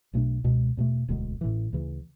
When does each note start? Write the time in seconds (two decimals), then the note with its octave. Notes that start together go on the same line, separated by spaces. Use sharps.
0.13 B1 B2 A3 D4
0.44 C#2 B2 G#3
0.77 E2 B2 A3
1.08 E1 D2 D3 G#3
1.41 A1 A2 E3
1.73 D2 C#3 E3